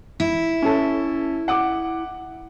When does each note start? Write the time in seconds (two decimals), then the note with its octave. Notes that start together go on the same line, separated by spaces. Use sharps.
0.20 E4
0.62 C#4 A4
1.48 F#5 D6